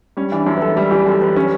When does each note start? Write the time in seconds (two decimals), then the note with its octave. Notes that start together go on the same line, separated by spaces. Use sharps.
0.17 G3 C#4
0.32 E3 D4
0.46 F#2 E4
0.57 B4
0.61 F#2 A4
0.76 G3 A4
0.91 E3 G4
1.06 F#2 A4
1.22 F#2 B4
1.36 C#4 G4